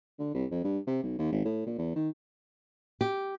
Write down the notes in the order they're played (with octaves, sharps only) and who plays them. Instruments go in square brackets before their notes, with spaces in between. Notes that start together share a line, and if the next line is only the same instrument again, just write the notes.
[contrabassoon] D3
C2
F2
G2
C3
B1
D#2
G#1
A2
A#2
E2
D#3
[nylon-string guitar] G4